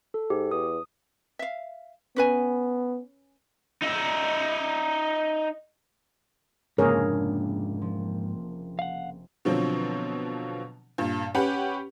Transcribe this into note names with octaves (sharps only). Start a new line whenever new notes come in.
A4
G#2 G4
E2 D#6
E5 F5
B3 C#4 B4 G#5
D#4 E5
F1 G#2 C#3 A#3 D4 G#4 A#4 C#5
F3
F5 F#5
B2 D3 F3 F#3 C4
G2 A#2
C#4 G4 B4 F#5 B5